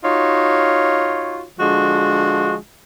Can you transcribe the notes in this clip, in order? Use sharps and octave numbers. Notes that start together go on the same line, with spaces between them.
D#4 F4 F#4 C#5
D3 F3 G#3 F#4